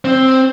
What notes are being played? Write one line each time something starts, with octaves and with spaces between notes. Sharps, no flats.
C4